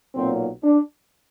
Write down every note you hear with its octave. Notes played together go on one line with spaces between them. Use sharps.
B1 A#2 F#3 C4
D4